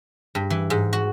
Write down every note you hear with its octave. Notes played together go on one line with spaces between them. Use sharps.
G2
E3
G#2
F#4